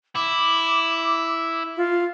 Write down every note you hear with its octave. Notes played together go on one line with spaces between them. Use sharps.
E4 D6
F4